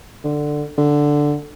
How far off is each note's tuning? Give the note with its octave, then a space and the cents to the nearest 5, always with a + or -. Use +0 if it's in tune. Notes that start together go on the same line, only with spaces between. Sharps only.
D3 +10
D3 +0